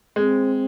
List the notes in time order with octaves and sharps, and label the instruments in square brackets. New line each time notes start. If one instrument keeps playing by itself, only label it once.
[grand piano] G#3 [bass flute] C4